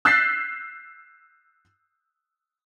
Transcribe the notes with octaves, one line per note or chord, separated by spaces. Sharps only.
E6 F#6 G6 A6 B6 C7